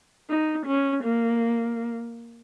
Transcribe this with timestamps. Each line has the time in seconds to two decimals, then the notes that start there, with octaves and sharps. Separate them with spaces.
0.29 D#4
0.67 C#4
1.04 A#3